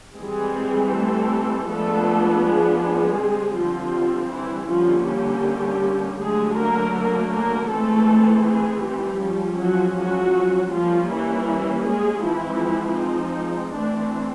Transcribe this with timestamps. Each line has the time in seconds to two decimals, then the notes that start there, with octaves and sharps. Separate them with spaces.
0.17 E3 G3 G#3 C4 G#4
0.93 A3 A4
1.68 F3 G#3 A3 B3 D4 A4
2.43 G#3 G#4
2.81 G#3 G#4
3.19 D3 G3 C4
3.56 F3 F4
4.32 E3 E4
4.69 D3 F3 G3 A#3 C#4 F4
5.07 G3 G4
6.20 D3 F#3 G#3 A3 G#4
6.57 A#3 A#4
6.95 A#3 A#4
7.33 A#3 A#4
7.71 E3 G#3 A3 C4 A4
8.46 G#3 G#4
8.84 G3 G4
9.22 F3 G#3 C#4
9.59 F#3 F#4
9.97 F#3 F#4
10.72 F3 G3 A#3 C#4 F4
11.10 E3 E4
11.85 G#3 G#4
12.23 E3 F3 G#3 C4 E4
12.99 D#4
13.74 E3 A3 C4 D4